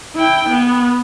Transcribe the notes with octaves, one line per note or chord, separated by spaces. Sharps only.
E4 G5
B3